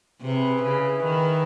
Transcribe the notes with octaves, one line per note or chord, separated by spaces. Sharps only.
C3 E4 G#4 B4
C#3
D#3